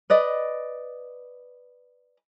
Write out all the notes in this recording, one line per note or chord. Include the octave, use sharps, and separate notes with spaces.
B4 D5 D#5